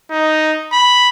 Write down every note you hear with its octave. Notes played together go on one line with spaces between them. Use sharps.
D#4
B5